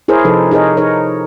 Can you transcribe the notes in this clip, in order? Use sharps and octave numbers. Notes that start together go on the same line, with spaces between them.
E4 G#4 A#4 C5 C#5
C3 F3 D#4 A4 B4
D#4 G#4 A#4 C#5 D#5
D#4 G#4 A#4 C#5